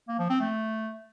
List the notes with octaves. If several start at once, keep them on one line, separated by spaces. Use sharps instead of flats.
A#3
F3
C4
A3